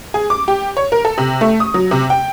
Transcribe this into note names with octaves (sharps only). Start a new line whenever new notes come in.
G#4
D6
G4
C#5
A#4
A4
C3
A3
D#6
F#3
C3
G5